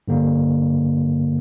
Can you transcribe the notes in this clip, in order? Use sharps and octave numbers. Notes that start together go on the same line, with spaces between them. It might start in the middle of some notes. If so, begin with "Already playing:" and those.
G2 D3 A#3